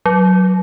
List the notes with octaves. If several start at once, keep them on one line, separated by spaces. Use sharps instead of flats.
F#3